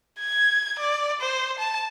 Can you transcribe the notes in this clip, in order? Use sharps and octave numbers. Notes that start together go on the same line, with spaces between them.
G#6
D5
C5
A5